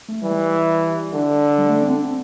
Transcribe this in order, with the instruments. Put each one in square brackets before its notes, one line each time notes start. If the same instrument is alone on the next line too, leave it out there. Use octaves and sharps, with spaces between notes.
[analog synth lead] A3
[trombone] E3 [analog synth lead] G3
[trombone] D3
[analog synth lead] G3
A3
C4
D4
C4